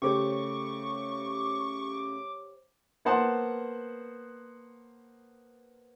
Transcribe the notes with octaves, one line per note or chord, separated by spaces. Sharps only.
C#3 A3 G4 C5 C#5 C#6 D6
A#3 B3 C5 F#5 A5 C6